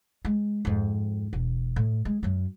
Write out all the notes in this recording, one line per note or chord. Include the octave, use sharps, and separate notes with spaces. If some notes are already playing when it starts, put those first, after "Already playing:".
G#3
F2 G#2
E1
A2
G#3
F#2 F#3